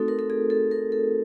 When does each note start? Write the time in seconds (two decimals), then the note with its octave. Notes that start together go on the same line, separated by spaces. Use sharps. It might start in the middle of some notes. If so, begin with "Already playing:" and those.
Already playing: A3 C4 D#4 F#4 A4
0.08 A#4
0.19 A4
0.30 G#4
0.50 A4
0.71 A#4
0.92 A4